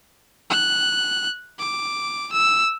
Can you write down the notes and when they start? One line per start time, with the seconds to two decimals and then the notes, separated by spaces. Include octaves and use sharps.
0.50 F#6
1.59 D6
2.33 E6